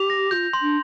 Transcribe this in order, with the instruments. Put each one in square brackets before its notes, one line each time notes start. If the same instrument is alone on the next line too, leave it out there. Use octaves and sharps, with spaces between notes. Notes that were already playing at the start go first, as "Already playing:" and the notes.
Already playing: [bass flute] G4 [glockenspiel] F7
[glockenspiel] A#6
[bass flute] F4 [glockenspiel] G6
[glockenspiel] C6
[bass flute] D4